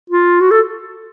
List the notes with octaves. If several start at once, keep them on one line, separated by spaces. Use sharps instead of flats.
F4
F#4
A4